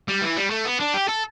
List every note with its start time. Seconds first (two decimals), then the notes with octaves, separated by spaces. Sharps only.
0.08 G3
0.21 E3
0.36 G3
0.50 A3
0.65 B3
0.80 D4
0.94 G4
1.08 A4